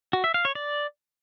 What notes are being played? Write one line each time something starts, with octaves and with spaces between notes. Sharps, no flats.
F#4
E5
F5
C#5
D5